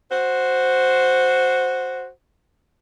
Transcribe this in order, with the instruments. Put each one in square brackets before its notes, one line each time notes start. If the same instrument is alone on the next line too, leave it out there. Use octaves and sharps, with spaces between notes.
[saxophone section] F#4 C5